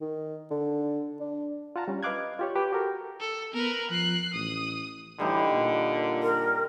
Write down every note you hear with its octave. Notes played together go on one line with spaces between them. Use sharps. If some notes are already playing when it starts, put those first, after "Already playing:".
D#3
D3
D4
F4 F#5 A5 A#5
G3 C#4
B4 D#5 F5 D6 F#6 G#6
F4 G4 C#5
G4 B4
F#4 G4 A4 A#4
A4
B3 A#4 B4
F3 F#6 C7
A1 D#6
A2 D3 E3 G3 D#4
A#2
A#4